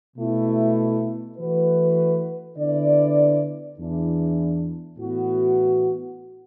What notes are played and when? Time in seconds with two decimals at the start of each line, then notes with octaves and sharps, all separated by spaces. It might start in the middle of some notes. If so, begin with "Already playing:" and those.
0.17 B2 A3 E4
1.37 E3 A3 F#4 B4
2.56 D3 B3 E4 D5
3.77 E2 E3 D4
4.96 A2 E3 B3 F#4